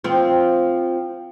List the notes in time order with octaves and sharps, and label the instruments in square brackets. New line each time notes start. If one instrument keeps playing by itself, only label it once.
[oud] F3 C4